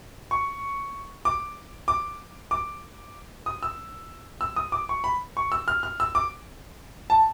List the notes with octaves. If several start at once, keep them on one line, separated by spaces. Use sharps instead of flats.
C#6
D6
D6
D6
D#6
E6
E6
D#6
D6
C#6
B5
C#6
E6
F6
F6
E6
D6
A5